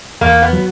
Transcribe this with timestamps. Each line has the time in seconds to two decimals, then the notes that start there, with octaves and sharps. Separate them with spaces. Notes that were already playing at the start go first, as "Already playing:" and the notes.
0.21 E2 A#3
0.42 B3
0.53 F#3